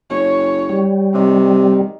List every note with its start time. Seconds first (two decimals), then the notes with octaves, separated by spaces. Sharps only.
0.10 F#1 C#5
0.69 G3
1.14 C3 D#3